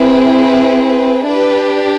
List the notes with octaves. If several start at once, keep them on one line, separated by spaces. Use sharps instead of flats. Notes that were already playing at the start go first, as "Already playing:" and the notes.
Already playing: C4 E4 G#4 B4
B4
B4
D4 G4 B4